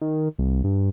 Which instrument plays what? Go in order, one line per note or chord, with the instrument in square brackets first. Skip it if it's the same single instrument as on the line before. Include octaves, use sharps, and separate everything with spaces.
[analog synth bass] D#3
C2
G2